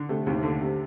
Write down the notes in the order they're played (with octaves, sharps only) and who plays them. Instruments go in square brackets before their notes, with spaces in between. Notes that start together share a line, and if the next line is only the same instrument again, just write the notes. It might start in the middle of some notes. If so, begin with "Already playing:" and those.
Already playing: [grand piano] D3
[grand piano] C3 [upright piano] A3
[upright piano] D#2 [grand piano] C3
[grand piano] D3 [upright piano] A3
[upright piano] C3